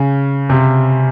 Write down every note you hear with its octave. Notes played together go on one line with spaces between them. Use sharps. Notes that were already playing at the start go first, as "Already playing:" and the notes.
Already playing: C#3
C3